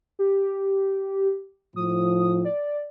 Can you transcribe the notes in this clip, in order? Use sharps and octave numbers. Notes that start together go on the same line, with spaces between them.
G4
A2 F3 D#6
D5